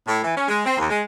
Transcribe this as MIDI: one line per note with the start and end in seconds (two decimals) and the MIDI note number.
0.07 0.20 45
0.23 0.35 52
0.36 0.44 61
0.48 0.61 56
0.66 0.77 60
0.77 0.85 39
0.89 1.00 56